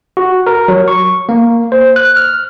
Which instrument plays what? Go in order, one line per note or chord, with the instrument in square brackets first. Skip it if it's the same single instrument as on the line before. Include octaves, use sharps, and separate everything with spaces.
[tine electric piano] F#4
A#4
F#3
C#6
A#3
C5
F#6
F6